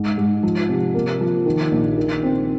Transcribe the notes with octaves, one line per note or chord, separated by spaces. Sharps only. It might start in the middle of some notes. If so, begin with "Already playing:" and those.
Already playing: G#2
G#2
F3
C3
A#3
F3
D#3
A#1
D#3
C4